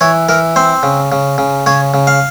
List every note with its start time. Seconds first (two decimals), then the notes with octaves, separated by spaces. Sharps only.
0.01 E3 C#5
0.29 E3 A#4
0.56 C4 C5
0.83 C#3
1.12 C#3
1.38 C#3
1.66 C#3 C#5
1.94 C#3
2.07 F5